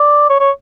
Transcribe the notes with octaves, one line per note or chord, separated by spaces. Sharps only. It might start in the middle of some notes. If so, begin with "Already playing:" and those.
Already playing: D5
C#5
C#5